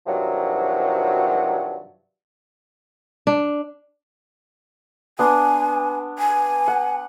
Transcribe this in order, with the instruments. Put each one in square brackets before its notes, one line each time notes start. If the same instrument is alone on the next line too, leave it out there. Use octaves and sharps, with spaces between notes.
[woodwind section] G2 C3 D#3 F3 F#3
[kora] D4
[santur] B3 D4 C6 [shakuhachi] G#5
[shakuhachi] G#5
[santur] F#5